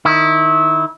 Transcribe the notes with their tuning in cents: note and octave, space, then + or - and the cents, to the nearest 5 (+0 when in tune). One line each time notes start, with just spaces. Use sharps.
D#3 -10 E4 -20